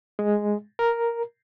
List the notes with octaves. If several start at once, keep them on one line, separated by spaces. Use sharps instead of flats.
G#3
A#4